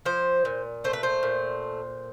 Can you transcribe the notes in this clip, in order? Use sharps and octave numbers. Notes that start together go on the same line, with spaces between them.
F3 C5
A#2
A3 C5
B4
C5
A#2